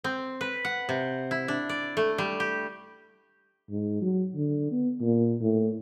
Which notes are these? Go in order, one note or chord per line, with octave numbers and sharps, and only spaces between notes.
C4
B4
F#5
C3
E4
D4
D5
A3
G3
G4
G#2
F#3
D3
B3
A#2
A2